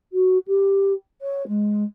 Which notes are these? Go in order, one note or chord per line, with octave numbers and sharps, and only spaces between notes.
F#4
G4
C#5
G#3